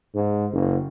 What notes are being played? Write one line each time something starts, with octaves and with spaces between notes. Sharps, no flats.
G#2
F#1